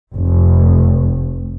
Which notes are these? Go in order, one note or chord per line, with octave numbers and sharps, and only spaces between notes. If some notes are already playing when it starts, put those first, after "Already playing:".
F1